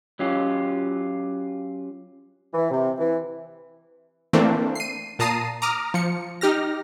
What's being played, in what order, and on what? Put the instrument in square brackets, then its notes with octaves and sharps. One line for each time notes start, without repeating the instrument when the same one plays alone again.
[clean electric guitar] F#3 C#4 F4 G4
[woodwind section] E3
C3
E3
[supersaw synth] E3 A3 A#3 C4 D4
C7 D#7
A#2 A5 A#5 D#6 C7 D#7
A#5 D6 D#6 F6
F3 C#7
D#4 G4 F6 A#6